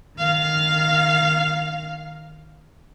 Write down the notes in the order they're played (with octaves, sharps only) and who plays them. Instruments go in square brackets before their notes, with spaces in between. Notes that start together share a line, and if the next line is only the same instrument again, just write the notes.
[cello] D#3 F5